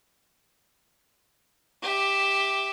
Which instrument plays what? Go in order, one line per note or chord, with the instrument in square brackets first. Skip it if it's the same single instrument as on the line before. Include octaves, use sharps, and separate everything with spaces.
[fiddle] G4 E5